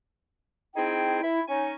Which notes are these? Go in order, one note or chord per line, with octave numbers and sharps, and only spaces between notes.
C4 D#4 E4 G#4 G5
E4
C#4 D#4 G#5